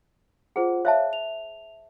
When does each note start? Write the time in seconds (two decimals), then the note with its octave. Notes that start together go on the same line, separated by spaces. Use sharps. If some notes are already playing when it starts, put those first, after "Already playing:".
0.56 F4 G#4 C5 F#5
0.85 C5 C#5 E5 F5 A5
1.13 F7